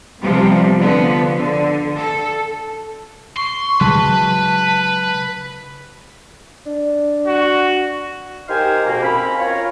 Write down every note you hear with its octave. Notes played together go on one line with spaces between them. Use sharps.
C3 F3 G3 B3
D3 F3 B3
D3
A4
C6 C#6
C#3 F#3 G#3 B4 A5
D4
F#4
D#4 G4 A#4 C5 F5 G#5
F2 G#2 B2 A#3
A#3 C4 C#4 B5
F4 A#4 C#5